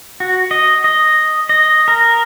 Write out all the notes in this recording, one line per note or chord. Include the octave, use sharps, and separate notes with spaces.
F#4
D#5
D#5
D#5
A#4